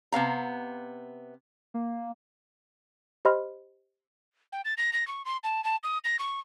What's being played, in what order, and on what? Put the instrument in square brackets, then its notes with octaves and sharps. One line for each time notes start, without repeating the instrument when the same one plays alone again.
[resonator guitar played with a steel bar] C3 B3 F5 A#5
[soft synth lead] A#3
[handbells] G4 C5 D#5 B5 C6 F6
[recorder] G5
A6
A#6
A#6
C#6
C6
A5
A5
D#6
A#6
C#6